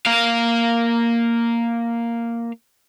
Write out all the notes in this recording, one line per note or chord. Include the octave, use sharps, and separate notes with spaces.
A#3 F5